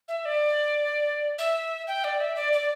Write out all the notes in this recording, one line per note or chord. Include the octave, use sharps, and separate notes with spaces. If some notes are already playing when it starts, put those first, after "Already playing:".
E5
D5
E5
G5
D5
E5
D5
D5